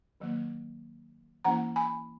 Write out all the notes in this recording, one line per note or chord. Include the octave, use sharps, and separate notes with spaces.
D#3 F#3 A#3
E3 A#3 C#4 E4 F#5 A#5
G#5 B5